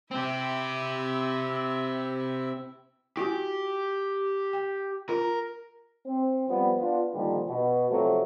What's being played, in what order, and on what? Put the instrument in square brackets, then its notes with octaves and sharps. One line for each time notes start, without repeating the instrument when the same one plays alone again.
[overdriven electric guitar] C4 G4 [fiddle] E4 E5
[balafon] E4 F#4 G#5 [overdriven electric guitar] G4
[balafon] G5
[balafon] F4 [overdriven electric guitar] A#4
[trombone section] C4
F3 G3 B3
B3 D4 F4
A#2 D3 D#3 F3 G3
B2
F2 C3 F3 F#3 A3